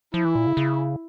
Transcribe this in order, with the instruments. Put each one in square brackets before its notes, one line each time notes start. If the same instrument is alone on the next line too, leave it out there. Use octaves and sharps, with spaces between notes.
[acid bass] F3 [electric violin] E4
[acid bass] E3
A#2
C#3
C#3